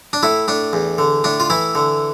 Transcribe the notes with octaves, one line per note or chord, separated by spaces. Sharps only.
D4
A2 E4
A2 D4
E2
D3
A2 D4
F4
E3 E4
D3